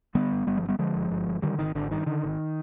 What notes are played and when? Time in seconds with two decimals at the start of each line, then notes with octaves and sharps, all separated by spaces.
0.15 D3 G3 B3
0.32 G1
0.47 G1 G3 B3
0.57 F3 G#3
0.64 G2
0.68 G3 B3
0.79 D3 F3 G#3
0.95 G1
1.10 G1
1.26 G2
1.42 D3 D#3 G3
1.58 G#1 D#3
1.75 G#1 D3
1.91 G2 D#3
2.06 D3 D#3
2.23 G#1